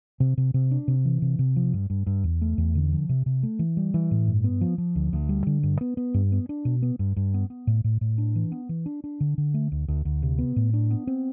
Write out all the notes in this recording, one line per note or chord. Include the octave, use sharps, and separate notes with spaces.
C3
C3
C3
D4
C3
E3
C3
C3
F3
G2
G2
G2
E2
A3
E2
D3
F3
C3
C3
A3
E3
G3
E3
A2
G2
B3
F3
F3
D2
D2
G3
D3
G2
B3
B3
G2
B3
D4
B2
B3
G2
G2
B3
B3
A2
A2
A2
D4
E3
B3
E3
D4
D4
D3
D3
A3
D2
D2
D2
C3
B3
A2
D4
B3
C4